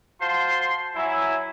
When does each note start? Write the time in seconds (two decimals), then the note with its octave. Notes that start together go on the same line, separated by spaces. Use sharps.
0.22 F4 F#4 C5 A5 C6
0.96 F#3 E4 G#5